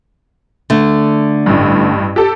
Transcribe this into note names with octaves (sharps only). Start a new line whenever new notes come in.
D3 A3
A1 G2
G4 A4